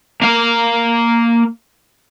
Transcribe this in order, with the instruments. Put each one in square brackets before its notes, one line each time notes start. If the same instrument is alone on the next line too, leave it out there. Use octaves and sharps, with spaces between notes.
[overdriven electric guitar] A#3 F5